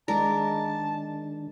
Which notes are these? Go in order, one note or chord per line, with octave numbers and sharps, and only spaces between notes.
D#3 G#3 D4 A#4 D5 A5